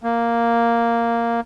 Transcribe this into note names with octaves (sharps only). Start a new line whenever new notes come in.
A#3